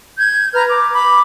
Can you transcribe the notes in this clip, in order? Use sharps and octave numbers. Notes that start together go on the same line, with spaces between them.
G6 G#6
B4 A#5 F6
D6
B5 D6